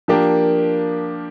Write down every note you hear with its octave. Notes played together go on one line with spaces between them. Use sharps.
F3 A#3 D4 G4 A#4